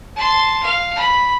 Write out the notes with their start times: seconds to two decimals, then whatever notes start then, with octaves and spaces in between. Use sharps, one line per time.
0.16 A5 C6
0.63 F5
0.96 B5